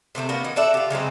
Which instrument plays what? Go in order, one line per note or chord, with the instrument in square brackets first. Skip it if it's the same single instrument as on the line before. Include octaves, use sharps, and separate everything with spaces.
[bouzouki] C3 A3 B3 C4
A#3 B3 D4 F#4
E3 D#5
F#4 A4 D5 E5
F4 G4
C#3 F#3 G#3 C4